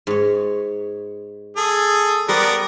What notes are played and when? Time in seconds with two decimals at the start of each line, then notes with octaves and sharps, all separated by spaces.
0.07 G#2 C#5
1.57 G#4 A4
2.29 G3 B3 A4 A#4 C5 D5